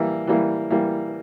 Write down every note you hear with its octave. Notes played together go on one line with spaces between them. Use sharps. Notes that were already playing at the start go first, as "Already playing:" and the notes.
Already playing: E3 G3 A#3 E4
E3 G3 A#3 E4
E3 G3 A#3 E4